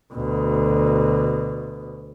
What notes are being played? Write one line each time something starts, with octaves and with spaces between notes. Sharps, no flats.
D2 B2